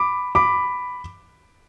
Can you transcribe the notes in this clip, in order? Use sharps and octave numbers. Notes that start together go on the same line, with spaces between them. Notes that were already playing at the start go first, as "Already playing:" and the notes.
Already playing: B5 D6
B5 D6